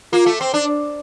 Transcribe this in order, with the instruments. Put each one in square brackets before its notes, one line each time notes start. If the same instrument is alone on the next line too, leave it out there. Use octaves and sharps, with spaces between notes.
[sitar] A#3 [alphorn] F4
[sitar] A3
C4
D4